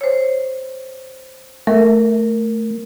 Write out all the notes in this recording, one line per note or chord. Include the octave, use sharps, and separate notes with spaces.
C5 C#5
A3 A#4